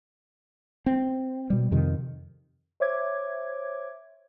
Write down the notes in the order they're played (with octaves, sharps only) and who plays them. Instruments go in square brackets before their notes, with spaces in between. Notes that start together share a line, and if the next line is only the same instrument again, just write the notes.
[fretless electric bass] C4
B2 G3
F2 C3 D#3
[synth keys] C5 C#5 E5 D6 G#6